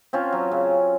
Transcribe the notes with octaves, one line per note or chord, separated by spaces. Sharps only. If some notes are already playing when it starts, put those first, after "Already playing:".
C4 C#4 F4
F#3
C#3